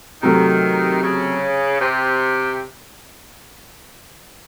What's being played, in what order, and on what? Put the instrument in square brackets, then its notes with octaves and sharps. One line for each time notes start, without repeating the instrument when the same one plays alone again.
[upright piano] C3 F#3 A3 [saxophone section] D#3
[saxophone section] C#3
C3